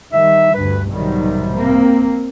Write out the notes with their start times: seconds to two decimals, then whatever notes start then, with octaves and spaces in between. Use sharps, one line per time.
0.12 D#3 G3 E5
0.54 D2 G2 B4
0.92 B1 G#2 C3 D#3 F#3 G3
1.55 A#3 C4